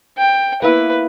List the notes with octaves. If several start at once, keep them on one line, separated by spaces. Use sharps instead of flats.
G5
A#3 B3 E4 B4